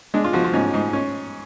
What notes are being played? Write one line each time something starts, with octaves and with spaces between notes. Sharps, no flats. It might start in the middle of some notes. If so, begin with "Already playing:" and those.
G#3 D4
F4
F3 F#4
F4
G#2 C#4
G#2
C#4